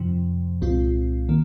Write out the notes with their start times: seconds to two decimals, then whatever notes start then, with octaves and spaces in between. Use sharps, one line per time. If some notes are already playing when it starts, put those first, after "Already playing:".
Already playing: F2 C3 F3
0.61 C2 A#2 G#3 C4 F4
1.29 D#3 A#3